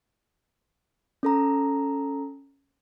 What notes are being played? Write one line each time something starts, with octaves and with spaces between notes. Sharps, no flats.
C#4 A4 A#5